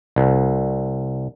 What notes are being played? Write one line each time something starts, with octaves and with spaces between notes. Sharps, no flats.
C2